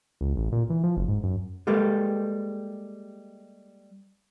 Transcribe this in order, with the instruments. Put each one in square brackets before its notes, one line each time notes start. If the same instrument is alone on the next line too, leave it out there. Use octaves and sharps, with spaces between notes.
[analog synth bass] C#2
A1
A#2
E3
F3
F#1
G#2
F#2
[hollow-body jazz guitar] G3 G#3 A#3 G4 A4 B4